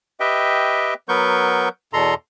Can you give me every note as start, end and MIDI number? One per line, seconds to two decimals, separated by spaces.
0.20 0.94 67
0.20 0.94 71
0.20 0.94 75
0.20 0.94 76
0.20 0.94 79
1.09 1.69 54
1.09 1.69 59
1.09 1.69 70
1.09 1.69 71
1.09 1.69 85
1.09 1.69 91
1.93 2.14 40
1.93 2.14 47
1.93 2.14 69
1.93 2.14 82
1.93 2.14 84